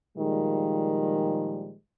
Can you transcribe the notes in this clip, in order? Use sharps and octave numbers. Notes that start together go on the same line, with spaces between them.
A#2 D#3 F3 G3 G#3